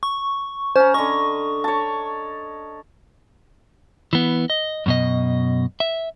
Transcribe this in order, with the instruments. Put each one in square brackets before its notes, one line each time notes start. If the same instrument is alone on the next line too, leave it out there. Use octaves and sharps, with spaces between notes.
[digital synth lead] C#6
[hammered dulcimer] C#4 A#5 [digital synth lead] C5
[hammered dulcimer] D3 D#5 [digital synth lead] C#6
[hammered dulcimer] C#5 A5
[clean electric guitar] E3 B3
D#5
F#2 B2 D#5
E5